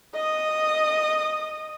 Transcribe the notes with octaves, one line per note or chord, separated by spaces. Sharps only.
D#5 D#6